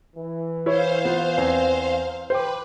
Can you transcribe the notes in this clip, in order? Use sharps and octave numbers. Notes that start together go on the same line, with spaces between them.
E3
E4 C5 C#5 F5
B3 F4 B4
E2 C4 G#5
B4 C5 G5 D6